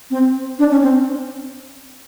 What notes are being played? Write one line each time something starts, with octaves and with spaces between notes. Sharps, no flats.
C4
D4
C#4
C4